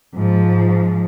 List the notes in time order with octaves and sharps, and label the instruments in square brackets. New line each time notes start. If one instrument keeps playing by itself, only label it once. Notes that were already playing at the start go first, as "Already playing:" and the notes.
[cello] G#2 F3